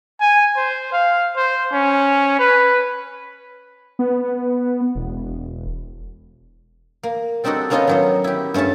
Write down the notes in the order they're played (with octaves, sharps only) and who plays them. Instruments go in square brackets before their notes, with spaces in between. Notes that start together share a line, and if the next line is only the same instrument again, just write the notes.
[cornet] G#5
C5
F5
C5
C#4
B4
[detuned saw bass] B3
E1
[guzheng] A#3
G3 C4 D4 D#4 F#4 A4
A#3 B3 C#4 D#4 F4 D#5
D#3 F#3 D#4
E4 G4
G2 A3 C#4 C#5 A5